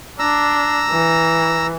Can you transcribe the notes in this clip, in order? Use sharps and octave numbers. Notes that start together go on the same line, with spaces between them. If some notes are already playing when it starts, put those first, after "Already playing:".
D4 A#5 E6
E3